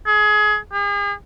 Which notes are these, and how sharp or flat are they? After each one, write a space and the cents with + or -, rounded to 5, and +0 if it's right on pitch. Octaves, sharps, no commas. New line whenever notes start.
G#4 +25
G#4 -40